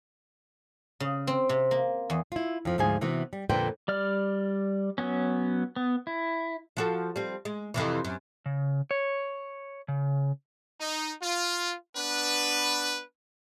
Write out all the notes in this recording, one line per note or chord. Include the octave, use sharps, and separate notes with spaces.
C#3
C4
C3
A#3
E2
E4 F4
F2 F3
D2 G#2 F3 F4 G#4 G#5
C3 E3 B3 F#4
G3
F2 A#2 D3 B4 C5 G5
G3 D5 F6
F#3 B3 C#4
B3
E4
F3 F#4 A4
G3 C4
G#3
F2 C3 E3
F#2
C#3
C#5
C#3
D#4
F4
B3 D4 B4